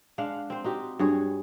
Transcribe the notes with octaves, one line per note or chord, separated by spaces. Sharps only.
G#3 D4 F5 F#5
C4 C5
D#4 F#4 G4
G2 F#4 G#4 C#5